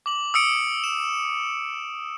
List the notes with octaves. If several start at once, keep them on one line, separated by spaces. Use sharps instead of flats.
D6 F#7
D#6 E6 C#7 D7
E7